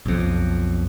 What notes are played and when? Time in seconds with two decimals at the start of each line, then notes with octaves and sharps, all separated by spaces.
0.06 B1 F2